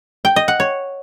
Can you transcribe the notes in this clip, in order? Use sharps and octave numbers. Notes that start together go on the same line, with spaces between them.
G5
D#5
F#5
C#5